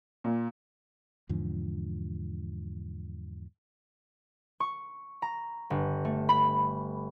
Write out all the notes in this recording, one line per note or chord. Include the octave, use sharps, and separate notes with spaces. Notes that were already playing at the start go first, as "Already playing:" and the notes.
A#2
E2 G#2 D3 F3
C#6
A#5
G1
A3
B5